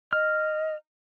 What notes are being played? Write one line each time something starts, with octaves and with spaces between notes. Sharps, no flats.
D#5 F6